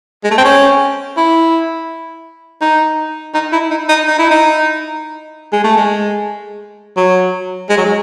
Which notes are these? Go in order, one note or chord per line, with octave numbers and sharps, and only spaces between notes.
G#3
A3
C4
C#4
E4
D#4
D#4
E4
D#4
D#4
D#4
E4
D#4
G#3
A3
G#3
F#3
G#3
F#3
G#3